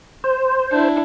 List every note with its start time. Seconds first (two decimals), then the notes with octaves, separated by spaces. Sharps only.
0.24 C5
0.72 D4 E4